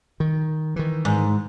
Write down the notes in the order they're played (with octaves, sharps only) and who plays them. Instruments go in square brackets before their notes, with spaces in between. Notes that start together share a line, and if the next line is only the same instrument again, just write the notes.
[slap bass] D#3
D#3 E3
[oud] G#2